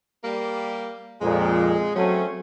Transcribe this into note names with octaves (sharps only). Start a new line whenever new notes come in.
G3 A#3
F2 A#2 G#3
F#3 A3 C4 C#4